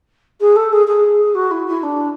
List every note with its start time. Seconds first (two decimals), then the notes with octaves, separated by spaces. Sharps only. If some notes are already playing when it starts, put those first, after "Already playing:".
0.41 G#4
0.56 A4
0.72 G#4
0.87 G#4
1.35 F#4
1.51 E4
1.67 E4
1.83 D4